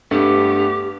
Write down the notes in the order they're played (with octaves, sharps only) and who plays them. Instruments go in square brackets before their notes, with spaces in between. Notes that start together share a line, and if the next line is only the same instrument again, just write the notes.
[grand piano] G2 A3 B3 [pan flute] G4